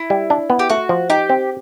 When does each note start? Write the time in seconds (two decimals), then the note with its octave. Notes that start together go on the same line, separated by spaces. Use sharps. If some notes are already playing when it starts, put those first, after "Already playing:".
Already playing: E4
0.10 G3
0.30 D4
0.50 B3
0.59 G4
0.70 A3 F#4
0.89 F3
1.10 D#4 G4
1.29 C4